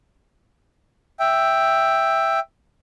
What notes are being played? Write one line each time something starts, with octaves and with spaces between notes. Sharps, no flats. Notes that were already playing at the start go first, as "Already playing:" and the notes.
E5 G5